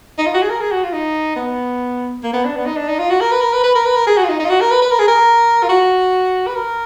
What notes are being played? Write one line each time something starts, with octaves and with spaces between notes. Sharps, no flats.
D#4
F4
F#4
G#4
A#4
G#4
F#4
F4
D#4
B3
A#3
B3
D4
B3
D#4
D4
D#4
F4
F#4
A#4
B4
A#4
B4
B4
A#4
B4
A#4
G#4
F#4
F4
D#4
D#4
F4
F#4
A#4
B4
B4
A#4
G#4
A#4
F4
F#4
B4
A#4